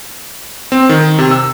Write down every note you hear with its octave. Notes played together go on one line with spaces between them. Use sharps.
C4
D#3
C3
E6